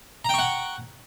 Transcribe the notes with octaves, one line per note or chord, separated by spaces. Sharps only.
F#5 G5 A#5 C#6